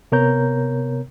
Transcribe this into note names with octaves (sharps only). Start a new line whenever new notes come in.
C3 B3 A#4 C#5 A#5 G6